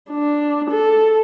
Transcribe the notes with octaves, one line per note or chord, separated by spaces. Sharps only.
D4
A4